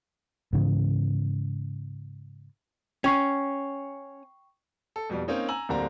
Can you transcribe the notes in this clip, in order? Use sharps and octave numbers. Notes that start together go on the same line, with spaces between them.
G#2 C#3 E3
C#4 G5 C#6 C7
A4
F2 B2 G3
A#3 C4 C#4 D#4
G#5 A#5 E6 F#7
D1 D3 G3 A#3 C4 A#5